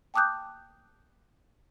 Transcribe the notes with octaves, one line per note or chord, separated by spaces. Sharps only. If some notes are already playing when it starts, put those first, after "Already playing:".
G5 A5 D6 D#6 F#6 G6